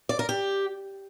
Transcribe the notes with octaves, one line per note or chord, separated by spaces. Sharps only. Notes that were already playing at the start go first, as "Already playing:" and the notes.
D5
A#4
G4